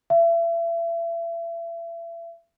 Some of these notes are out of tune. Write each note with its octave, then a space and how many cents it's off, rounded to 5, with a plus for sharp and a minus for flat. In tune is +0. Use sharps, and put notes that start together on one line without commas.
E5 +35